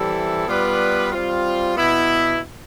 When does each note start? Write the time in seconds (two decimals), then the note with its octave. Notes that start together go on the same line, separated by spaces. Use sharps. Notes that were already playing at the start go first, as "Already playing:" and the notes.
Already playing: E3 G3 C4 E4 A4
0.47 G3 B3 F4 B4 D5
1.12 G3 C4 F4
1.76 B2 B3 E4